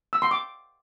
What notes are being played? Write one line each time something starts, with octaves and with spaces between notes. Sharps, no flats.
E6
C6
D6